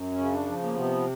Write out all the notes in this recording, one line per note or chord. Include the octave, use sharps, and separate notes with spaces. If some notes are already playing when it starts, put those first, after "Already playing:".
Already playing: F#2
C#4
C#3
D4
F3
A#3
C3 B3